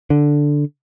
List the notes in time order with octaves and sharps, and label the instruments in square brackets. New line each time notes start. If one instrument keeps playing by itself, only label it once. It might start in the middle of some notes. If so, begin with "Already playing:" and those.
[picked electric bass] D3